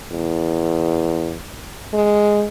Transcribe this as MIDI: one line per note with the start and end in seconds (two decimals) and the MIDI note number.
0.12 1.38 40
1.93 2.46 56